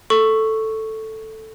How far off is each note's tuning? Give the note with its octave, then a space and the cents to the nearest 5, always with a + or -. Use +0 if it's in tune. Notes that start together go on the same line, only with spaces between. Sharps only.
A4 +0 C#6 +0